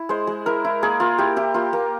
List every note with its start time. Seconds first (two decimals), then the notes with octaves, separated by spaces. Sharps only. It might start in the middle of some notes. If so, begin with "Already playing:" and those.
Already playing: E4
0.09 G#3 C5
0.27 G#3
0.46 E4 A#4
0.65 E4
0.83 A#3 G#4
1.00 A#3 F4
1.18 E4 G4
1.36 E4 G4
1.54 A#3 F4
1.73 A#3